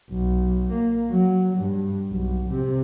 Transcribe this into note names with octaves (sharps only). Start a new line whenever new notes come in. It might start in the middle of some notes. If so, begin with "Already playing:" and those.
B1
A#3
F#3
G2
B1
C3